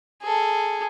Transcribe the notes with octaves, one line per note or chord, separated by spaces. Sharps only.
G#4 A4